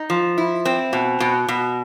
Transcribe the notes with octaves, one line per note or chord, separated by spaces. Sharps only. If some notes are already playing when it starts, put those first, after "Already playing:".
Already playing: D#4
F3
E4
C4
B2
B2
B2